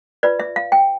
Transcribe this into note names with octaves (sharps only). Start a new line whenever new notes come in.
F4 B4 D5
E5
F5
G5